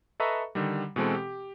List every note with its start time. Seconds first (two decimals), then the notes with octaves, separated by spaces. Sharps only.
0.20 A4 B4 D#5 E5 A#5 C#6
0.55 D3 D#3 G3
0.96 B2 E3 G#3 C4 A4
1.15 G4